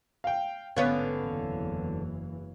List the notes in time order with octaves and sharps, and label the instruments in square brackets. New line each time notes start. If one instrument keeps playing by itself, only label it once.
[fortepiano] F5 G5
[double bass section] A1 G#2 [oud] D3 B3 C#4 [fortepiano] C#5 F5
[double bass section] F#1 E2 E3